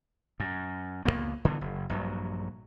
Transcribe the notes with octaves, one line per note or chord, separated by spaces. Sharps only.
F#2
C#2 A#2 A#3 B3
D3 E3 A3 B3
F#1
A#1 G2 F#3